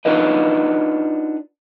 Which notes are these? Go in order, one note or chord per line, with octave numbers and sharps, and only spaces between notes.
D4 D#4 F4 F#4 B4 D#5